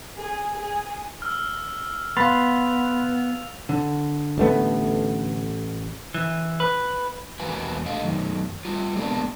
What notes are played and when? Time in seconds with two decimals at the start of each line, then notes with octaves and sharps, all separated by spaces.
0.17 G#4
0.56 G#4
1.22 E6 F6
2.17 B3 F5 B5 C6 A6 F7
3.69 D3
4.38 A1 A3 B3
6.14 E3
6.60 B4
7.40 E2 A#3 F#4 B4 G#5
7.86 D3 D#5 F5
8.04 F#2 D#3
8.65 G3 F4
8.97 G#3 A#3 B3 D4 D#4 G#4